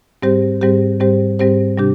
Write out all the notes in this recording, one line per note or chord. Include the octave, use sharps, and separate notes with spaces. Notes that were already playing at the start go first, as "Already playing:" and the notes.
G#2 G3 C4 G4 C5
G#2 G3 C4 G4 C5
G#2 G3 C4 G4 C5
G#2 G3 C4 G4 C5
C3 G3 D4 G4